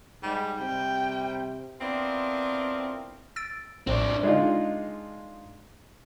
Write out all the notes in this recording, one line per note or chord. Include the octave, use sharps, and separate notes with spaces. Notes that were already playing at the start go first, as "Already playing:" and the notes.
G#2 G3
C3 G3 G5
B3 C4 D4 E4 F4 A#4
E6 A6 D7
A#1 A2 C4 D4
G#3 D4 D#4 F4